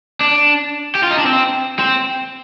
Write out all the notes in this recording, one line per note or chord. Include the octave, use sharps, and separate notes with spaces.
D4
G4
F4
D#4
D4
C4
C4